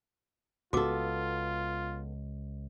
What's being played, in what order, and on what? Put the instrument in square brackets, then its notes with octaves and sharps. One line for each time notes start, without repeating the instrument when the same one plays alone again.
[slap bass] C#2 [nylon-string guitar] B3 A4 [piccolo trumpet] F4 [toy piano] F#4 D6